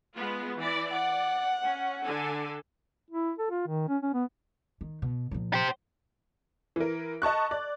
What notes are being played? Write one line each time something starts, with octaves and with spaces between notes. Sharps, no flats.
G#3 B3 F4
E3 D5
D5 F#5
C#4
D3 A4 G#5
E4
A4
F4
D#3
C#4
C#4
B3
D#3
B2
A#2 F3
G4 C5
E3 A#4
D#5 A5 C#6 F#6
D5